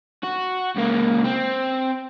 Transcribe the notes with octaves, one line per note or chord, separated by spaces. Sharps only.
F#4
C#2 A#3
C4